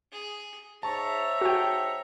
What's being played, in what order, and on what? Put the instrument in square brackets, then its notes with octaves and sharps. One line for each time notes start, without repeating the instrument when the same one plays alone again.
[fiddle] G#4
[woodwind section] G#2 E5 [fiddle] C#5 A#5 [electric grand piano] A5 C#6
[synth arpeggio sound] F#4 G5